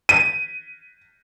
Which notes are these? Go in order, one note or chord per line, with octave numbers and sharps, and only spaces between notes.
D#7